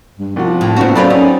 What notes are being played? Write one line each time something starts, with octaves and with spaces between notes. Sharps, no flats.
G2
C2 F3 F#4
A2
A#2 C#3 B3 C4 F#4
F#2 A3 C4 F4 D5 B5
C#4 D#4